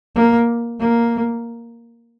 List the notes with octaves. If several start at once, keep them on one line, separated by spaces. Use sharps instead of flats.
A#3
A#3